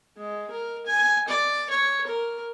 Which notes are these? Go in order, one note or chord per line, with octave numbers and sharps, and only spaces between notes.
G#3
A#4
G#5
D5
C#5
A#4